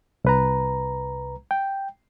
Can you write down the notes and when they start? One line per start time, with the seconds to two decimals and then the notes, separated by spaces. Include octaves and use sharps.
0.25 C2 B4 A#5
1.51 G5